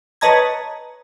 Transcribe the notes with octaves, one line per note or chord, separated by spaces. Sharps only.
B4 C#5 D#5 A5 A#5 G#6